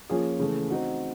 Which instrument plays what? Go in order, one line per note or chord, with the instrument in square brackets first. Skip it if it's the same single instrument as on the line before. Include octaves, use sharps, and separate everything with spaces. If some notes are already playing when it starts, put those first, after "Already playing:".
[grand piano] F3 A#3 C#4 F4 G#4
C#3 E3 A3
C4 D#4 F#4